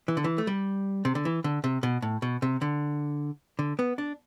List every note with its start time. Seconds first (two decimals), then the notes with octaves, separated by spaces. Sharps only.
0.08 E3
0.17 D3
0.24 E3
0.38 A3
0.47 G3
1.05 C3
1.15 D3
1.25 E3
1.44 D3
1.64 C3
1.83 B2
2.02 A2
2.22 B2
2.42 C3
2.62 D3
3.59 D3
3.79 B3
3.98 D4